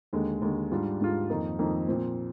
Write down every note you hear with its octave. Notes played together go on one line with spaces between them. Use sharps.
D#2 D3 G#3
D#2 D3 G#3
G#2 G3 D4 F4
G#2 G3 D4 F4
F2 D#3 A#3 D#4
F2 D#3 A#3 D#4
A#2 F3 C4